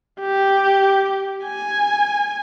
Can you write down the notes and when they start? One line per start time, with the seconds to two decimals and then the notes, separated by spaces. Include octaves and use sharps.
0.21 G4
1.45 G#5